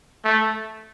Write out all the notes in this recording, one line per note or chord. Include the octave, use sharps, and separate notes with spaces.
A3